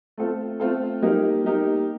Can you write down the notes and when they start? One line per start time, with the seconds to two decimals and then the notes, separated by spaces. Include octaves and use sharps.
0.18 A3 C4 F4 A4
0.60 A3 C4 F4 A4
1.02 G3 A#3 D#4 G4 A#4
1.44 G3 A#3 D#4 G4 A#4